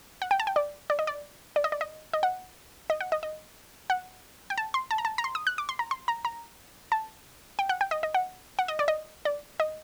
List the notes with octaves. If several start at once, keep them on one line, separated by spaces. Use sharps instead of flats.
F#5
G5
A5
G5
D5
D5
D#5
D5
D5
D#5
D5
D#5
D#5
F#5
D#5
F#5
D#5
D#5
F#5
G5
A5
C6
A5
A#5
A5
A#5
C6
D#6
F#6
D6
C6
A#5
C6
A#5
A#5
A5
G5
F#5
G5
D#5
D#5
F#5
F#5
D#5
D5
D#5
D5
D#5